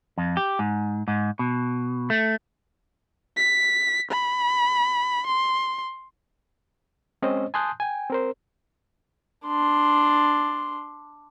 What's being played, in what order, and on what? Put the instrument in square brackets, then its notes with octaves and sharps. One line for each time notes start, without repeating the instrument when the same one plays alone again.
[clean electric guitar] F2
G4
G#2
G#2
B2
A3
[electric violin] B6
B5
C6
[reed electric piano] G#3 C4 C#4 C5 D#5
G#5 A5 C6 D#6 F#6 G6
G5 G#5
C4 A#4 C5
[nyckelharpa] D4 C6